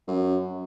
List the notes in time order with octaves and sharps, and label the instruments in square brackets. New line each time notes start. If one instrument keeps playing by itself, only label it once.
[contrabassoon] F#2